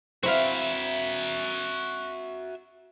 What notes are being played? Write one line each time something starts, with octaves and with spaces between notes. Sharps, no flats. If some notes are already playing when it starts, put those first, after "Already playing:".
C4 E4 F#4 E5 F5